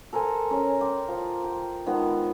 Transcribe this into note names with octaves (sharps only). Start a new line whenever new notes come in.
A4 A#4 C5 G#5
C#4 A#4
G5 C6 D6
F3
G5
D#3 F3 G#3 B3